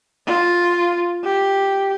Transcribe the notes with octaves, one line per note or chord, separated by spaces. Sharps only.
F4
G4